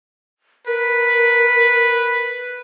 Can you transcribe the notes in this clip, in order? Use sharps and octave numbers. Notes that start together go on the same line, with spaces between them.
A#4 B4